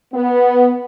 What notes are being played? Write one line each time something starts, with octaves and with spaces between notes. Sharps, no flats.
B3